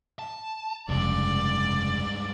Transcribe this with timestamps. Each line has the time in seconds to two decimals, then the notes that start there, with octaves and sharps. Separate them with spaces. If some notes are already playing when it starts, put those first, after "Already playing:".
0.19 A5
0.89 F1 C#2 G2 G#3 D5